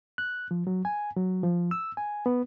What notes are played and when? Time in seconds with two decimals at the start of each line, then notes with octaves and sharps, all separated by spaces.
0.18 F#6
0.51 F3
0.67 F#3
0.85 G#5
1.16 F#3
1.43 F3
1.71 E6
1.97 G#5
2.26 B3